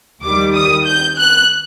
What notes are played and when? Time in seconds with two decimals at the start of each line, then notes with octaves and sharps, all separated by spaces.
0.23 D#2 D#3 G3 D6
0.54 D#6
0.86 G6
1.18 F#6